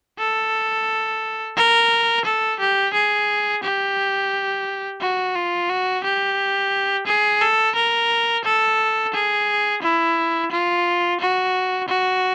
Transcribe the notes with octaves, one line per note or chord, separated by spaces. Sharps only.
A4
A#4
A4
G4
G#4
G4
F#4
F4
F#4
G4
G#4
A4
A#4
A4
G#4
E4
F4
F#4
F#4